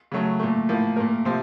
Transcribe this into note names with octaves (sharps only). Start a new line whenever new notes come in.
C#3 F#3 A3
A#2 A3
A2 F3 A#3
A#2 A3 A#4
C3 F3 C5